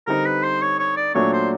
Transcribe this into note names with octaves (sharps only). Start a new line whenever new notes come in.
D3 G3 C4 D#4 A#4
B4
C5
C#5
C#5
D5
A#2 F#3 A3 D4 C#5
C5